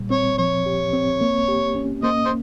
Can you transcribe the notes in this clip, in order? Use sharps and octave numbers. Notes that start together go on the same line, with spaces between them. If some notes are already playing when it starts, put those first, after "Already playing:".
Already playing: A#2 G3
C4 C#5
F3 C#5
G4
C4
A#3
G4
C#4
A#3 C5 D#5
C5